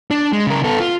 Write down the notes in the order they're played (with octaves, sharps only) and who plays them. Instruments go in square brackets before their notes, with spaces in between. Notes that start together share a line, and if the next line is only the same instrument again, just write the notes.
[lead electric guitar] D4
G#3
C#3 A#4
B3 A4
F4